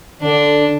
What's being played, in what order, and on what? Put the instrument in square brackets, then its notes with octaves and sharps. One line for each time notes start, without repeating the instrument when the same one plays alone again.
[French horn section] D3 [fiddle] D4